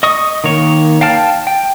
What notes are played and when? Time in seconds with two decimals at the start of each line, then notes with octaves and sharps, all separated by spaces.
0.03 D#5 C#6 D#6
0.44 D#3 A#3 C#5
1.01 F5 G5 A5 F6
1.47 G5